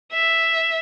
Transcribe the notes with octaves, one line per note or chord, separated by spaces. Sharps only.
E5